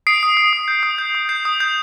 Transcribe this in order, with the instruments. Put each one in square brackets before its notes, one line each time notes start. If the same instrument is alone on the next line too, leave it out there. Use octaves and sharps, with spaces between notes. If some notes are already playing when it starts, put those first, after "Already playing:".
[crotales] D#6 C7 D7
D#6
D#6
D#6
G6
D#6
G6
D#6
G6 C7
D#6
G6